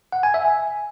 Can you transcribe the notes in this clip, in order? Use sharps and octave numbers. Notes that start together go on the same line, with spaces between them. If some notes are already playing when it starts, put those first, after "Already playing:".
F#5
G#5
E5
G#5